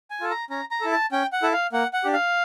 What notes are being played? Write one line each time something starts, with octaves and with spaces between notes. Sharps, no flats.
G#5
F4 A4
A#5
C#4 A#5
A#5
E4 A4
A5
C#4 G5
F#5
E4 A4
F5
A#3 F#5
F#5
D4 G4
F5